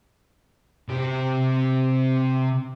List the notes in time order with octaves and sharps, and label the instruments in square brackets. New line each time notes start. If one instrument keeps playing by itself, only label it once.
[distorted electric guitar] C3 G4